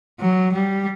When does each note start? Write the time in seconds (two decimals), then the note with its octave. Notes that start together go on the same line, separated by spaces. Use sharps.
0.21 F#3
0.53 G3